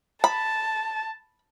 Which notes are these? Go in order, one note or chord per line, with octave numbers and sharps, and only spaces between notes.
A5 B5